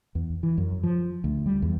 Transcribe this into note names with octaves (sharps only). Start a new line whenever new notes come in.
E2
E3
F#2
F3
D2
G3
E2